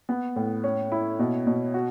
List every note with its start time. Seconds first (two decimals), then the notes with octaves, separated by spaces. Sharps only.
0.09 B3
0.36 A2
0.64 C#4
0.92 E4
1.19 B2
1.47 B2
1.74 F#4